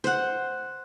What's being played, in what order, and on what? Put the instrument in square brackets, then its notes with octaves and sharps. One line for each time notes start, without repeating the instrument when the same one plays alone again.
[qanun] C5 F#5